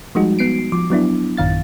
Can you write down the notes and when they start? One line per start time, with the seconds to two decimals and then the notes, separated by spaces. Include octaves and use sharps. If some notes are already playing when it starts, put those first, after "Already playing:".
0.15 F3 G3 G#3 D#4 F#4
0.39 B3 C7 D7
0.72 F3 D6
0.90 F#3 B3 D4 E4
1.37 A1 F#2 D#3 F5 A6